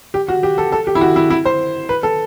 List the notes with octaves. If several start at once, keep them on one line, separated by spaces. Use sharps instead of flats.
G4
F#4
G4
A4
A4
G4
E4
F#4
E4
E4
C5
B4
A4